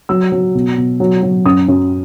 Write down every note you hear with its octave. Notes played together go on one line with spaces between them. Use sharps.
F#3 E6
F#3
B2
B2
F#3
F#3
F#2 D#6
F#2